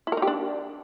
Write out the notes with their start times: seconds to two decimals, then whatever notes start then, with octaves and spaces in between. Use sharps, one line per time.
0.07 E4
0.12 A#4
0.17 D#4
0.22 G4
0.27 D4